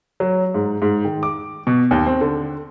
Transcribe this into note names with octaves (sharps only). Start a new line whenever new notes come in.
F#3
G#2
G#2
D#3
D6
B2
D#2
C4
D3